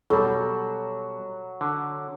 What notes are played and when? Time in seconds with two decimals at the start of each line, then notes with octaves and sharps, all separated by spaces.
0.10 B2 F#3 G3 A4
1.61 D3